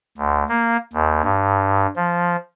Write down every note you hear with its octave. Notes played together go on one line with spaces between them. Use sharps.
D2
A#3
D#2
G2
F3